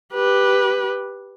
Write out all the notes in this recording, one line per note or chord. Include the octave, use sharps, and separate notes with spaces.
G4 B4